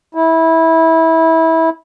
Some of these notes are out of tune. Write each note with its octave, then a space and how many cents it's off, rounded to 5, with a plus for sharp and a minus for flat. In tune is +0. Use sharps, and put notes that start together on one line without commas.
E4 -20